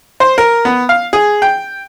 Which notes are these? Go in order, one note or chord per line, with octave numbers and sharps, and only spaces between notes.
C5
A#4
B3
F5
G#4
G5